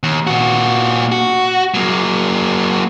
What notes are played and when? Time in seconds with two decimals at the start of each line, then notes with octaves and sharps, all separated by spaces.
0.03 D#2
0.27 A#2 F#4
1.12 F#4
1.74 F#3 A#3